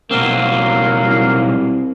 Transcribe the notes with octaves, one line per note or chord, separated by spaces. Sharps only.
B1 F#3 A#3 C4
C2